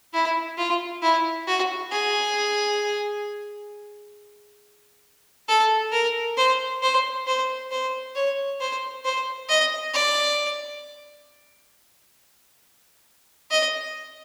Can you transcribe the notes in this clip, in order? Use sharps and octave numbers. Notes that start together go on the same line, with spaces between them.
E4
F4
E4
F#4
G#4
A4
A#4
C5
C5
C5
C5
C#5
C5
C5
D#5
D5
D#5